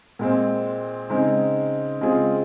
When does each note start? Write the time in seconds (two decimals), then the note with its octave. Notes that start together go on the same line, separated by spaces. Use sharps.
0.19 A#2 G#3 C4
1.10 C#3 G#3 C4 D#4
2.01 C#3 G#3 C4 F4 G#4